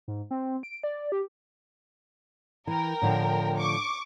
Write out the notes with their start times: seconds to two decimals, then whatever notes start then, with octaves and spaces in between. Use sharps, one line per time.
0.08 G#2
0.31 C4
0.63 D7
0.84 D5
1.12 G4
2.67 E3 A#4 G5
3.02 A2 D3 F3
3.58 C#6 D6